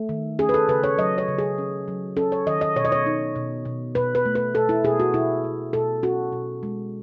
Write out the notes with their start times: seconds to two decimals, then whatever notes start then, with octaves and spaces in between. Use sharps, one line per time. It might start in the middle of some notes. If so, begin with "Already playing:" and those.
Already playing: A3
0.09 D#3
0.39 C#4 G#4
0.49 B4
0.54 A4
0.68 C#3 B4
0.83 C#5
0.98 F#3 D#5
1.18 C#5
1.28 C#3
1.38 G#4
1.58 C#4
1.88 F#3
2.17 C#4 A4
2.32 C#5
2.47 D#3 D#5
2.61 D#5
2.76 B2 C#5
2.85 D#5
2.92 C#5
3.06 D#4
3.36 B2
3.65 B2
3.95 B2 B4
4.15 B4
4.26 A3
4.35 B4
4.55 B2 A4
4.69 E4
4.84 B2 G#4
5.00 F#4
5.14 B2 E4
5.44 B2
5.73 B2 A4
6.03 C#4 F#4
6.32 B2
6.63 G#3